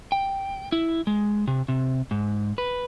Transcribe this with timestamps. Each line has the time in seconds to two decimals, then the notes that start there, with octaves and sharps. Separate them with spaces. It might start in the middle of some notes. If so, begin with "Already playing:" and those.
0.12 G5
0.72 E4
1.07 G#3
1.48 C3
1.68 C3
2.11 G#2
2.58 B4